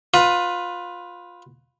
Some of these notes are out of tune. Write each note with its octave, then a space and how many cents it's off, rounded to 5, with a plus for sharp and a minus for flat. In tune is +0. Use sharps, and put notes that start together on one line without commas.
F4 +20 B4 +10